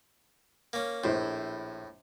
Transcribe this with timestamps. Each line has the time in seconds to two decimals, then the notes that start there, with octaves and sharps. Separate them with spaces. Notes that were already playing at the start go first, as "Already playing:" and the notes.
0.73 A#3 C#4
1.04 A#1 A2 E4 C5